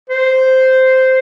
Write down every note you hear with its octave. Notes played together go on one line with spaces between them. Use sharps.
C5